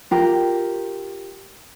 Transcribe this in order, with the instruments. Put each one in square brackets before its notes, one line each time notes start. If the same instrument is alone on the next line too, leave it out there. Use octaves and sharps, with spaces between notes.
[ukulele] F4 G4 A#4